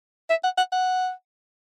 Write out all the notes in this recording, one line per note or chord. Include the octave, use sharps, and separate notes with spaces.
E5
F#5
F#5
F#5